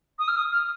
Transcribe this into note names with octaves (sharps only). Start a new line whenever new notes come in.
D#6
F6
D#6
F6